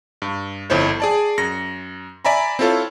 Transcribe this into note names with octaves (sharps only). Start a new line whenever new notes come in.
G2
G1 F2 E4 C5 C#5
G#4 D5 A5
F#2 A#6 C#7
D5 E5 G#5 A#5 B5
C4 E4 F4 A4 C#5